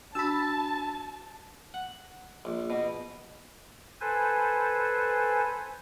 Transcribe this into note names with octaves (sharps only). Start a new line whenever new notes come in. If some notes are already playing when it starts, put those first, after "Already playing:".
D4 F#4 A5 B5 E6
F#5
A#1
B2
A4 B4 C5 G#5